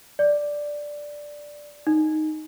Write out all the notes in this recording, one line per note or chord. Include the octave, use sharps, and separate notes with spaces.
D5
D#4